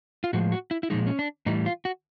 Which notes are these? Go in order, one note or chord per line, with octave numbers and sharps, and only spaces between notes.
F4
A2 F3 G#3 F#4
F#4
E4
E4
A#2 F3 G#3 D#4
C#4
D4
A2 E3 G3 D#4
F4
F#4